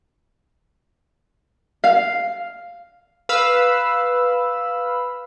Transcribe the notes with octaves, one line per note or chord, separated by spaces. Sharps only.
F5
B4 F5 B5 E6